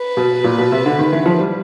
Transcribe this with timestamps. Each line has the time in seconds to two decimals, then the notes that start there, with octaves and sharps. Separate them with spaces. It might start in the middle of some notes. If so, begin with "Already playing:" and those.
Already playing: B4
0.17 B2
0.44 A#2
0.58 B2
0.72 C3
0.86 D3
0.99 D#3
1.12 E3
1.26 F3
1.40 G3